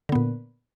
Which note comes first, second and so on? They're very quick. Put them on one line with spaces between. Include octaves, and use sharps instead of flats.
D3 B3 A#2